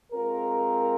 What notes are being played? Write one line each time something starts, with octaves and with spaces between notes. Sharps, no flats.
G#3 C4 F4 A#4